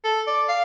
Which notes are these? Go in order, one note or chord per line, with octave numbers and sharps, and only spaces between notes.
A4
D5
F5